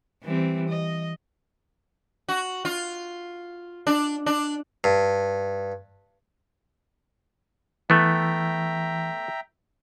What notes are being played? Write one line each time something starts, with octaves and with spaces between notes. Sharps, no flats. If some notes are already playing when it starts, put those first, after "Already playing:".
E3 G3 C4
D#5
F#4
F4
D4
D4
G2
E3 A3 B3 E5 G5 A#5